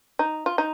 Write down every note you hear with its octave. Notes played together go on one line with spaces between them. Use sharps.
D#4
F4
D#4